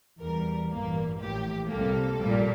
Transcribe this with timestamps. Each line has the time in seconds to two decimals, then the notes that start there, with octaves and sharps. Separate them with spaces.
0.20 E2 E3 G3 A#4
0.71 A1 G2 E3 A#3
1.20 A#1 A2 E3 G4
1.70 C2 C3 G3 A#3 A4
2.19 A#1 A#2 G3 A#3